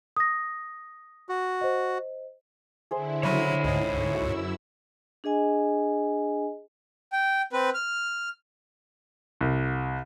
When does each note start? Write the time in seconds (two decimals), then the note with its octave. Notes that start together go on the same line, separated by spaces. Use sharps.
0.17 D#6 A#6
1.29 F#4
1.61 C5 D#5
2.91 D3 E4 G#4 C5 E5
3.23 C#3 F#3 C#5 B5
3.64 C#2 G#2 D#5
4.15 F#2 E4 F#4 F#5 E6
5.24 D4 G#4 D#5 G#5
7.12 G5
7.53 C4 B4
7.74 F6
9.41 C2